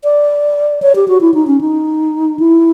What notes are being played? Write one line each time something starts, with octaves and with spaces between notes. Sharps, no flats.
D5
C#5
G4
F#4
E4
D#4
C#4
D#4
E4